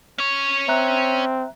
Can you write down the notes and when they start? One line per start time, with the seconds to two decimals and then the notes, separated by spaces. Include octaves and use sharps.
0.18 C#4 C#5
0.68 C4 E5 A#5 F#6